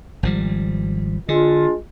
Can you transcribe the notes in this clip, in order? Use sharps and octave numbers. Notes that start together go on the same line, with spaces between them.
G#1 F3 G3
D3 G#3 D4 F4